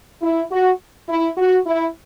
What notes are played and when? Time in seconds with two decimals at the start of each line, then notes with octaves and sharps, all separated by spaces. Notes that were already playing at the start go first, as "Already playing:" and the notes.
0.22 E4
0.51 F#4
1.09 E4
1.37 F#4
1.66 E4